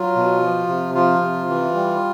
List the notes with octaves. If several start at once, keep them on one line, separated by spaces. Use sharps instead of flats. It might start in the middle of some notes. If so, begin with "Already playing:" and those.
Already playing: F#3 F4
B2
F3
C3
F3 F4
C3
E3
G3